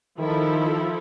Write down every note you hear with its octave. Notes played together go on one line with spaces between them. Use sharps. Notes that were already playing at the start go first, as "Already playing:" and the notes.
D#3 F3 E4 A4